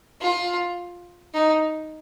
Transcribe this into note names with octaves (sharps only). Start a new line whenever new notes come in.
F4
D#4